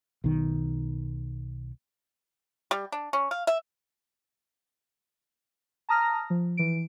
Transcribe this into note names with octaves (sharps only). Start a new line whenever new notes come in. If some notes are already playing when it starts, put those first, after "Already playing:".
B1 D#3
G3
D4
C#4
F5
E5
A5 A#5 D#6 F6 A#6
F3
E3 D7